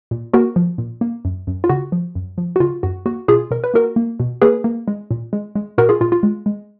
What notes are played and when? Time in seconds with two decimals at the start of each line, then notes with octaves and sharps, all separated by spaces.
0.11 A#2
0.33 A#3 F#4 A#4
0.56 F3
0.78 A#2
1.01 A#3
1.25 F#2
1.47 F#2
1.64 F4
1.69 C#3 F#4
1.92 F3
2.15 F#2
2.38 F3
2.56 F#4
2.60 C#3 F4
2.83 F#2 F#4
3.06 A#3 F#4
3.28 B2 F4 G#4
3.51 B2 A#4
3.64 B4
3.74 A#3 F#4 A#4
3.96 A#3
4.20 B2
4.42 A#3 G#4 B4
4.64 A#3
4.88 G#3
5.11 A#2
5.33 G#3
5.56 G#3
5.78 A#2 F#4 A#4
5.89 F4 G#4
6.01 A#2 F4
6.12 F4
6.23 G#3
6.46 G#3